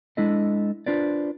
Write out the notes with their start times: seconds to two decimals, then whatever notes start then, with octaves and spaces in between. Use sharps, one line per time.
0.17 G#3 D4 E4 A4 D#5
0.86 D4 F4 B4 C5 D5